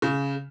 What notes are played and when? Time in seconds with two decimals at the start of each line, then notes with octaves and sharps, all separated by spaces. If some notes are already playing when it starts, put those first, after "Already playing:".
0.02 C#3